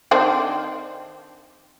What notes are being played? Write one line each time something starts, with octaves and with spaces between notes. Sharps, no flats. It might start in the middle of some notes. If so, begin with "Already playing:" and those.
D#3 C4 D4